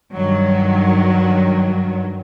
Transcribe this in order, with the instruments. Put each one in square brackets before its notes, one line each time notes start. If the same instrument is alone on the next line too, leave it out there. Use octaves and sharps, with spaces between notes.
[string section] G2 D#3 F#3